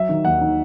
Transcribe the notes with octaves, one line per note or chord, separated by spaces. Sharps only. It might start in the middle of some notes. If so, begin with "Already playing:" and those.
Already playing: F#3 E5
D#3
D#2 F#5
D#3